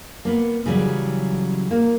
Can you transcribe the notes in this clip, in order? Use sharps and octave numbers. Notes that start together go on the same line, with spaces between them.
A#3 B3
C#3 E3 F#3 G3
A#3